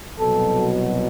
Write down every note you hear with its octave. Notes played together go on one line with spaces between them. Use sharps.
C2 B2 F#3 A4